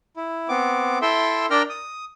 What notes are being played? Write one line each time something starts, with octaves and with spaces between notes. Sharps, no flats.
E4
B3 C4 D6
E4 A4 E5 G5 C6
D4 A#4 D5 G5 A#5 F6
D#6